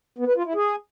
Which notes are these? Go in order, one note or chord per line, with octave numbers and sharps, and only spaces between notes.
B3
B4
F4
E4
G#4